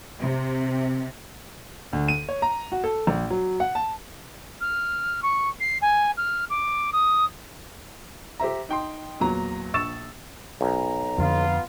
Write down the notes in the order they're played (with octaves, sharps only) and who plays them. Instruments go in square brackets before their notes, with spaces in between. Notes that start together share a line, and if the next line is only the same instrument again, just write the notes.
[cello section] C3
[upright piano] D2
D#7
C#5
A#5
F#4
A4
A#1
F#3
F#5
A5
[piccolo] F6
C#6
C7
G#5
F6
D6
D#6
[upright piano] G4 C5 E5 A#5
D#4 G5 C6
E2 A#2 F#3 A#5
A#1 C#6 E6 A6 E7
[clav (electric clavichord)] B1 [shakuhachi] A#5
[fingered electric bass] F2 D3 [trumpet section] B3 F4